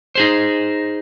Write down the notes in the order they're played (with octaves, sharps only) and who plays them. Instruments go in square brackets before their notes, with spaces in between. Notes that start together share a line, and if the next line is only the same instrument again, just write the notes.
[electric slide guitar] D#4 G#4 C5